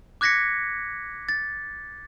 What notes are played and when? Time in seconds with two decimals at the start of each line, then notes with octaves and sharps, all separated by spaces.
0.21 D6 F#6 G#6 A#6 B6 C#7
1.29 A6